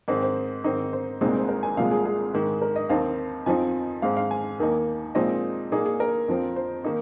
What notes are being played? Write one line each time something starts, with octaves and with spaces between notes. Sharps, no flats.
G#2 D#3 C4 D#5
C5
G#2 D#3 C4 D#4
C5
C2 A#2 G#3 C4 D#4
C5
A#4
G#5
C2 A#2 F3 G#3 F5
G#4
G#4
G#2 D#3 G#3
A#4
D#5
D#2 D#3 C4 D#4 F5
F2 F3 C4 D#4 G#5
G#2 G#3 C4 F5
F5
G#5
D#2 D#3 A#3 D#4
A#2 F3 G#3 C4 D#4 D#5
A#2 A#3 D#4 G#4
G#4
A#4
F2 F3 C4
C5
D#3 A#3 D#4